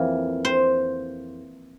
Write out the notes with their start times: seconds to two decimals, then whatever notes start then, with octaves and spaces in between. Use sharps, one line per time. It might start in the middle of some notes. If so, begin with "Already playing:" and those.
Already playing: F2 E3 A#3
0.45 C5